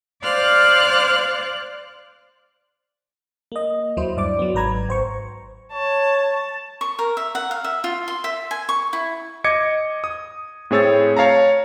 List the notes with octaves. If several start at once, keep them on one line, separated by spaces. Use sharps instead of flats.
C5 D5 F5 F6 F#6
A#3 D#5
D#2 F#3 E4 C5
G2 D5 D6
F#3 B3
G#1 G#2 B4 A#5 G#6
G#1 C5 C#6
C#5 A5
C#6
A#4
E5
F#5
F5
E5
F4
C6
E5
G#5
C#6
E4
D#5 D6 G#6 C#7
D#6
A2 C4 G#4 C#5 E6 A6
C#5 F5 A5 A#5